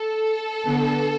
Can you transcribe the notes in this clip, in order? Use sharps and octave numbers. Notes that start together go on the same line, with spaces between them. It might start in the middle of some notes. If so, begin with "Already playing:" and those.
Already playing: A4
D3 B3